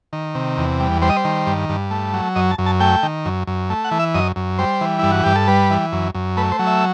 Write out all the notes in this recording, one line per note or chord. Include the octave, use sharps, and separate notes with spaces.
D#3
C3
E2
G3
G3 C5
D#5
C5
D#3
G2
G2
A3
F#3
F#2 D#5
A5
F#2
A5
A3 G5
D#3
F#2
F#2
A3
F#5
E3
E5
F#2 D#5
F#2
G3 C5
E3
G2 E4
F#4
G2 G4
A4
G3 B4
E3
F#2
F#2
A3 B4
C5
F#3
E5